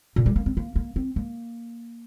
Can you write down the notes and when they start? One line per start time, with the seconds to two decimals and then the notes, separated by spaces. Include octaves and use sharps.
0.16 A#2
0.26 G3
0.36 A#3
0.46 C4
0.57 A#3
0.76 A#3
0.96 C4
1.16 A#3